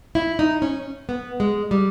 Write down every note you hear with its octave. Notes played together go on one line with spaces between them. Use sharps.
E4
D#4
C#4
B3
G#3
G3